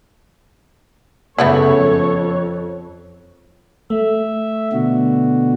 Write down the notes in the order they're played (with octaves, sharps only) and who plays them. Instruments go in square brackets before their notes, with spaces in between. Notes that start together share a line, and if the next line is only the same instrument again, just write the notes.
[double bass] F#2 C#3 [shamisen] A3 B3 E4 [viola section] A4 C#5
[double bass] F2
[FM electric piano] A3 [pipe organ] E5
[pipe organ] B2 D3 F#4